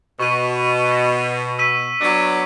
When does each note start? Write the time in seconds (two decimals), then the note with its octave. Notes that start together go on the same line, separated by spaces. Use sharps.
0.20 B2 C#6 D#7
0.92 A#6 E7
1.59 E6 B6 D#7
2.01 F#3 B3 D4